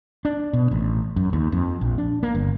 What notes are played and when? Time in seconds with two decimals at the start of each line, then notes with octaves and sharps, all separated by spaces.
0.25 D4
0.53 B2
0.71 A1
1.16 F#2
1.33 D#2
1.52 F2
1.81 A#1
1.98 D4
2.23 A#3
2.35 G1